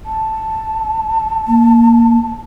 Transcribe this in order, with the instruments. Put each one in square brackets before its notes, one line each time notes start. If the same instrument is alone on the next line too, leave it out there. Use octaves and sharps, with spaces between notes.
[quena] A5
[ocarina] A#3